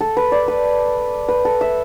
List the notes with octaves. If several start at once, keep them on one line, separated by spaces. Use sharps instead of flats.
A4
B4
D5
B4
B4
A4
E5